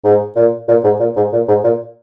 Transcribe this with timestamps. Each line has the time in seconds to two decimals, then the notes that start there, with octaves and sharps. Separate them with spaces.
0.04 G#2
0.36 A#2
0.68 A#2
0.84 G#2
1.00 A#2
1.16 G#2
1.33 A#2
1.48 G#2
1.64 A#2